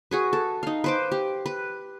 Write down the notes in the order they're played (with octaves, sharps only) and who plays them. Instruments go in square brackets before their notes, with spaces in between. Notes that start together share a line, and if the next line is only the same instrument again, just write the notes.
[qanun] F#4 G#4 B4
A4
D#4 F5
B4 C5 D6
G4
B4